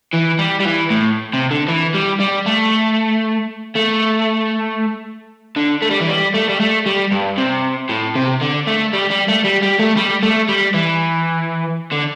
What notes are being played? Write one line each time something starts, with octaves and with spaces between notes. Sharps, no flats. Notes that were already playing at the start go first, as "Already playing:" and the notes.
E3
G3
G3
E3
A2
C3
D3
E3
G3
G3
A3
A3
D3
A3
G3
E3
G3
A3
G3
A3
G3
G2
C3
A2
C3
D3
A3
G3
G3
A3
G3
G3
A3
G3
A3
G3
E3
D3